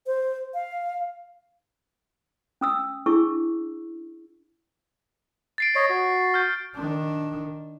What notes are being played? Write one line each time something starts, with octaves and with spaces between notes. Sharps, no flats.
C5
F5
C#4 D#6 E6
D4 E4 G#4 C#6 E6
A6 C7 D7
C#5 D#5
F#4
F6 G6
D#3 D4